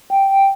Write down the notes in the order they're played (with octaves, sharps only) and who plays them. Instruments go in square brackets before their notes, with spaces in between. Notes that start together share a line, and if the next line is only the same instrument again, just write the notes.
[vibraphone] G5